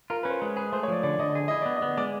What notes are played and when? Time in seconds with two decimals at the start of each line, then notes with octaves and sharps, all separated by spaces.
0.10 F4 A#4
0.23 C#4 B4
0.30 C5
0.41 G#3 B4
0.57 G#4 B4
0.73 A3 C5
0.83 C#5
0.88 F3 D5
1.03 D3 D5
1.19 D3 D#5
1.35 G#4
1.48 E4 D#5
1.62 B3 D5
1.76 D#5
1.82 B3
1.97 G#3 D5